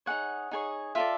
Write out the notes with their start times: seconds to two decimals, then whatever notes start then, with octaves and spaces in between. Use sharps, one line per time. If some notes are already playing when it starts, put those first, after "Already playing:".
0.06 D#4 G#4 C#5 F#5
0.51 D#4 G#4 C#5
0.95 F4 A4 D5 E5